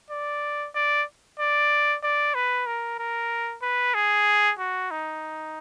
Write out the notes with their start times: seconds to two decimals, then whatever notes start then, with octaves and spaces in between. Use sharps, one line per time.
0.11 D5
0.75 D5
1.40 D5
2.03 D5
2.35 B4
2.67 A#4
2.99 A#4
3.63 B4
3.95 G#4
4.59 F#4
4.91 D#4